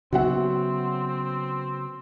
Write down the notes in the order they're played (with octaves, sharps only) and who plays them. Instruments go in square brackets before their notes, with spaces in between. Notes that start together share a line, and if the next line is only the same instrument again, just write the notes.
[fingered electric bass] C#3 F#3 B3 [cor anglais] C4 [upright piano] F#4 E5 F#5